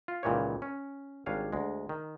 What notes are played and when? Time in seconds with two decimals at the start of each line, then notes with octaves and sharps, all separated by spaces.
0.08 F4
0.23 C#2 A#2 D#3 E3 G4 C#5
0.62 C#4
1.26 G#1 G3 D4 C#5 F5 G#5
1.53 D2 G#3
1.89 D#3